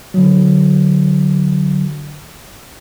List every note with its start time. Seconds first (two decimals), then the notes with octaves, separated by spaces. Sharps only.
0.14 D3 F#3